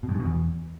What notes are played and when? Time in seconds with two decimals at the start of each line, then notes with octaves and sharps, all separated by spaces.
0.03 B2
0.09 G2
0.14 G#2
0.20 B2
0.25 E2